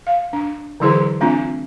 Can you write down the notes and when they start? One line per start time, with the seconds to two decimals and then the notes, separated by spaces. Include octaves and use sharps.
0.07 F5
0.33 D4
0.80 D3 E3 F#3 E4 G#4 C5
1.21 A3 C4 D4 F4